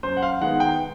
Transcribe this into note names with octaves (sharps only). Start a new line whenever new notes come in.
F#2 C5
F#5
F5
D#3 G#3 B3 F#5
G5